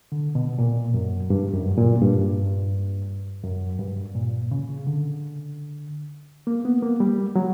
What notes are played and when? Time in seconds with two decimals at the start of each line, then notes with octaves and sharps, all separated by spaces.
0.12 D3
0.35 B2
0.59 A#2
0.94 F#2
1.30 G2
1.54 F#2
1.78 A#2
2.01 G2
3.44 F#2
3.79 G2
4.15 A#2
4.51 C#3
4.87 D3
6.47 A#3
6.65 B3
6.83 A#3
7.00 G3
7.36 F#3